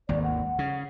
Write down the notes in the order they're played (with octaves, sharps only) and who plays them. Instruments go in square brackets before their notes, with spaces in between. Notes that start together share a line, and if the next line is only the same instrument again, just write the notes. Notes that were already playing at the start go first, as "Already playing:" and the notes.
[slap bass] G#1 D#2 [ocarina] D5
[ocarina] F#5
[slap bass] C#3